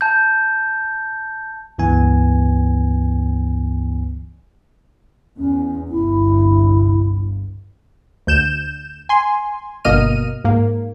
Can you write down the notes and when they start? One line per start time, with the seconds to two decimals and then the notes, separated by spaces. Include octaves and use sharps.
0.01 A5 G6
1.78 C#2 G2 E3 B3 G#5
5.38 E2 C#4
5.91 G1 C2 G2 E4
8.27 D2 G6 E7
9.09 G#5 C6
9.85 G1 B2 A#3 D#5 F6 D#7
10.44 G#2 A#3